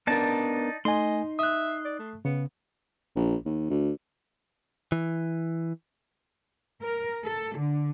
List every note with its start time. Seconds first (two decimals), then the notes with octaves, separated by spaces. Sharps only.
0.07 B3 D4 D#4 A#4 D5 A5
0.85 A3 D#4 D#5 G#5 C6
1.39 E5 D#6 F#6
1.85 D5
1.99 A3
2.25 C#3 B3
3.16 A#1
3.45 D#2
3.70 D2
4.92 E3
6.83 A#4
7.24 A4
7.56 D3